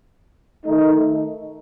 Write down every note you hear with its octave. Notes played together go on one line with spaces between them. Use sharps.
D#3 A3 D#4